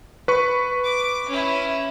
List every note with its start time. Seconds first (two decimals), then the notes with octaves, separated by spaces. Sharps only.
0.28 B4 C#6
0.84 D6
1.29 C#4 E4